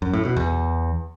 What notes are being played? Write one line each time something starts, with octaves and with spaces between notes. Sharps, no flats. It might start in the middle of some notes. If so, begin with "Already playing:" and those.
F#2
A2
B2
E2